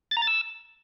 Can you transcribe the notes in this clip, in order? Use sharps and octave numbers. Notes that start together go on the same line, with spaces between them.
A6
A#5
A6
E6